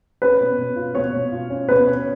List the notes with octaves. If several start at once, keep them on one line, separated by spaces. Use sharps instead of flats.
C#4 B4
B2
B2
F4
B2 C#5
B2
F4
C#4
B2 B4
C#4